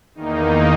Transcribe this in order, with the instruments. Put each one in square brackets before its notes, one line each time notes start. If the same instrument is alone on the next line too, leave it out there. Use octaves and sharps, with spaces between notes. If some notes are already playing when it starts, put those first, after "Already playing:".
[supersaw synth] E2 D#3 A#3 D#4